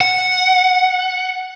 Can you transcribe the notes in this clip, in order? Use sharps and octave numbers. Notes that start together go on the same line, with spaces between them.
F#5